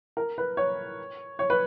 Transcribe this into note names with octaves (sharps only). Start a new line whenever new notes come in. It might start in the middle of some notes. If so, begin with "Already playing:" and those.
A#4
B4
C#5
C#5
B4